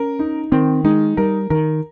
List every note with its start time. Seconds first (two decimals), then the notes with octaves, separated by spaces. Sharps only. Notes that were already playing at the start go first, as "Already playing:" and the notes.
Already playing: C#4 A#4
0.19 D#4
0.52 D#3 C4
0.84 G#3 D#4
1.17 G3 A#4
1.50 D#3 A#4